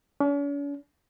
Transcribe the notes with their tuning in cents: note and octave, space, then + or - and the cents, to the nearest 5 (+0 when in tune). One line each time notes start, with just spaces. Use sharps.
C#4 +45